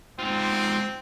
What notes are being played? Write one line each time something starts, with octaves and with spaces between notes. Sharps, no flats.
G#2 C4 F4